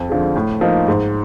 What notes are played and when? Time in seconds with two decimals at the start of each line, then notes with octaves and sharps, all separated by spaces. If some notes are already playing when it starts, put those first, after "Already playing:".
Already playing: F2
0.09 D3 F3 G#3
0.36 A2
0.61 F3 A#3 D#4
0.88 G#2